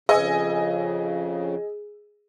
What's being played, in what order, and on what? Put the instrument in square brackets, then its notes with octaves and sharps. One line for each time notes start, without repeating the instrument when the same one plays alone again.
[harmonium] F2 C#3 [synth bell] G#4 [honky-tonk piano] D#5 G#5